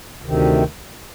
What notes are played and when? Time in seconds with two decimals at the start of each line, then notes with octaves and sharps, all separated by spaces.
0.22 D2 C3 D#3